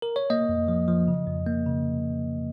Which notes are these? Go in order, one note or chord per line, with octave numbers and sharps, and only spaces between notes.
A#4
C#5
A#3 D#5
F2
F3
F3
C#3
F2
A#3
C#3